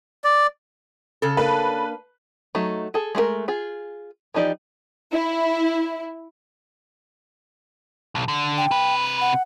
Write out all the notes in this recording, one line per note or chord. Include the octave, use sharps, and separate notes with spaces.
D5
C#3 A4
A#3 D4 B4
F#3 A3 D#4
G#4 A4
G#3 A3 F#4 A#4
F4 G#4
E3 F3 D#4 G4 D5
E4
B1
D3
G5
C3 B4
B5
F#5